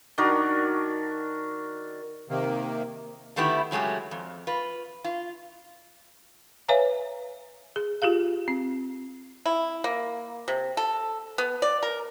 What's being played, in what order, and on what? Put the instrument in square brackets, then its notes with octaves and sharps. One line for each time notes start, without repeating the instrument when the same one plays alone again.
[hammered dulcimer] D#3 D4 F#4 A#4
[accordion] C3 D#3 A#3
[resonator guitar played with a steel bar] D3 D#3 A3 B3 E4 G4
C#3 F#3 G#3 A3 G4
F2
F4 B4
F4
[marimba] B4 C#5 E5 F5 G#5 A#5
G#4
F4 G4 G#4 F5
C4
[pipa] E4
A#3
C3
A4
B3
D5
A#4